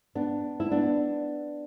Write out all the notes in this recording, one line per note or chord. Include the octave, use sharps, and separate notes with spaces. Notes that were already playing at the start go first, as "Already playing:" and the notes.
B3 D4
E4
B3 D4